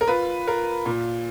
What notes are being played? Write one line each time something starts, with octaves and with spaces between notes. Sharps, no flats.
A#4
F4 B4
F4 A#4
A#2